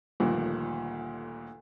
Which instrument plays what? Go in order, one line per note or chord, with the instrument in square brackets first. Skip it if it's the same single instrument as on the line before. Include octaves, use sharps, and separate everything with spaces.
[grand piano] G1 D2 G2 A#2 D#3 F3